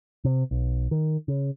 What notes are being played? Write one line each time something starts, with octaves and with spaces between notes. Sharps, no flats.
C3
B1
D#3
C#3